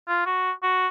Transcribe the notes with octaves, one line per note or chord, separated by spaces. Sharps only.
F4
F#4
F#4